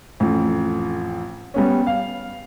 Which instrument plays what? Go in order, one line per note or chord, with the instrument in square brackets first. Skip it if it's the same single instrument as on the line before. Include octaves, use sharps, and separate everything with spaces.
[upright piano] A1 F2
G3 B3 C#4
F5